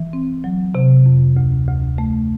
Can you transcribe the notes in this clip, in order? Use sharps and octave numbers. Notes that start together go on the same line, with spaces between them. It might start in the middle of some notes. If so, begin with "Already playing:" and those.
Already playing: E3
C4
F#3
C3
F2
D2
D2
A3